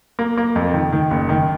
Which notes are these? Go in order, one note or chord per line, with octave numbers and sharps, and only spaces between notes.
A#3
A#3
F2
D#3
D#3
F#1
D#3